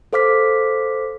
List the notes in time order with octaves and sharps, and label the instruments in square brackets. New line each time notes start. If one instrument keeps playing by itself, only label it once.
[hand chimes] A4 C5 F5 D6 F6 B6